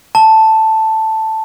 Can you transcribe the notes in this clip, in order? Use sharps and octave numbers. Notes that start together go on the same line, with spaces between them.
A5